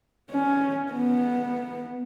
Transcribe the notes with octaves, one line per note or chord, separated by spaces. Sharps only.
C#4
B3